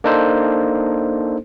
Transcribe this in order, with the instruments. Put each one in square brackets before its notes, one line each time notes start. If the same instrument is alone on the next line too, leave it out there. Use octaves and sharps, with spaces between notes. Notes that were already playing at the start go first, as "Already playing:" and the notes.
[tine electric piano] A#3 D4 D#4 A4 C5